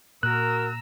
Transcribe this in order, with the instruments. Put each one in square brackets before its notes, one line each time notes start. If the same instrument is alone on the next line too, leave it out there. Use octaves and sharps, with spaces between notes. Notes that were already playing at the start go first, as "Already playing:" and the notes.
[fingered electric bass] A#2 [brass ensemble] F#4 A#4 [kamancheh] A#5 E6 [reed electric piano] F#6